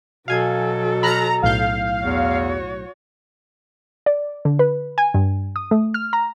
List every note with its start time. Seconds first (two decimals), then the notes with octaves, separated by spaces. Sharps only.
0.28 B2 F#3 A4 F5 G#5 G#6
1.03 A#5 B5 F6 F#6
1.42 B1 A2 F5 G6
2.03 E2 F#4 C#5
4.06 D5
4.45 D3
4.59 B4
4.98 G#5
5.14 G2
5.56 D#6
5.71 A3
5.94 F6
6.13 A#5